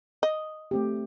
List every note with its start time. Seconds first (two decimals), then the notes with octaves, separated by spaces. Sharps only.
0.23 D#5
0.71 A3 C4 G4